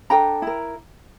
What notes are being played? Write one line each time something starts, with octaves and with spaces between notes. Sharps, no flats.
D4 A4 G5 A#5
E4 A#4